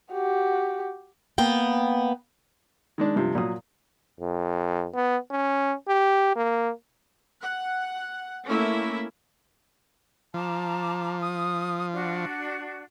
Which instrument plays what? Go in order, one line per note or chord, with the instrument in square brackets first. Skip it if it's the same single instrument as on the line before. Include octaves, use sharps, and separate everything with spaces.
[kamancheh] F#4 G4
[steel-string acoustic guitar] A#3 B3 G5
[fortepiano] D#3 G#3 D4
G2 C3 F3
A#2 F#3 D#6
[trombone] F2
B3
C#4
G4
A#3
[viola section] F#5
A3 A#3 C#4 E4 E5
[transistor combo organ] F3 [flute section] A5 A#5 D6
[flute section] D#6
D4 F#4